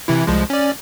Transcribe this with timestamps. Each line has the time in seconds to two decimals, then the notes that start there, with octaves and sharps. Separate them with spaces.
0.08 C3 E3 E4
0.27 C2 F3 G#3
0.50 C#4 D5